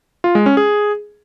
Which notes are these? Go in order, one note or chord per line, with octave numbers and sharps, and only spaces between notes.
F4
G#3
C#4
G#4